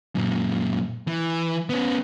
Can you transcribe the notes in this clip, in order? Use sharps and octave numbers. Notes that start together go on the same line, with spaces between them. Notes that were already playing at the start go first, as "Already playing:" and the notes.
F#2 A#2
E3
B3 C#4